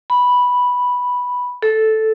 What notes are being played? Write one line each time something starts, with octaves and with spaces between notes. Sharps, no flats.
B5
A4